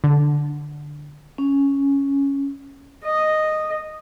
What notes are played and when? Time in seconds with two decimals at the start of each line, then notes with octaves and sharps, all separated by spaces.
0.04 D3
1.38 C#4
3.04 D#5